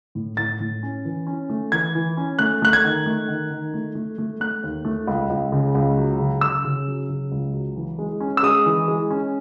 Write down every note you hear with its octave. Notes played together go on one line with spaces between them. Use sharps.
A2
A2 A6
A2
C#4
E3
C#4
A3
E3 G#6
E3
C#4
A3 F#6
A3 F#6
G#6
D#3
A3
D#3
D#3
A3
A3
A3
A3 F#6
D#2
A3
C#2
C#2
C#3
C#2
F#3
C#3
C#3 E6
C#3
F#3
C#3
C#2
F#3
E3
G#3
C#4
E6
G#3 D#6
E3
G#3
C#4